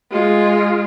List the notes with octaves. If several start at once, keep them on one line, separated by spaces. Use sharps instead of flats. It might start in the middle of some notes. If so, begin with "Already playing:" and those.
G#3 F4